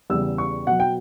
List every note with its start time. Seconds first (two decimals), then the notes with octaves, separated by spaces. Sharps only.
0.10 E2 C#3 G3 E6
0.38 C#6
0.66 B2 F#3 F#5
0.80 G5